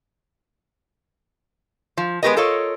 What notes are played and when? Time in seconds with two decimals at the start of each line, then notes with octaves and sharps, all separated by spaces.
1.97 F3
2.23 G#3 B3 C#4 G4 A#4 D#5
2.36 F4 A4 A#4 C#5 D#5